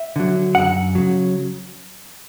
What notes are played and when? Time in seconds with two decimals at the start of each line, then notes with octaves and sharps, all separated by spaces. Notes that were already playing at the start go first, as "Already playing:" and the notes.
Already playing: E5
0.16 D3 F#3
0.55 F#2 F#5
0.95 C#3 F#3